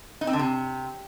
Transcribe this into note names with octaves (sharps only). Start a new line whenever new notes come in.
D#4
C4
D3
C3